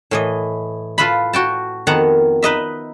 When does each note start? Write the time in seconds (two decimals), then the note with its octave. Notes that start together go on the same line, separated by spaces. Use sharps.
0.11 A2 E3 D#5
0.98 F4 A4 B4 E5 B5
1.33 F#4 G5 A5
1.87 F2 D#3 B3 F#5 A5 A#5
2.43 D#4 B4 D#5 E5